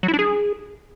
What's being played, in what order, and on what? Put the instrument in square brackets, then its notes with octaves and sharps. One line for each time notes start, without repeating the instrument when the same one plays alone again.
[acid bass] F#3
E4
D4
G#4